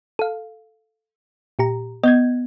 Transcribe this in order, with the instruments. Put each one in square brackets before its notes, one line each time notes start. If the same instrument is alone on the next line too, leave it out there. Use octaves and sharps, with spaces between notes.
[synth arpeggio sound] A4 F5
A#2 G4 A#5
[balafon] B3 [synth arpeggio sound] D#5 G6 G#6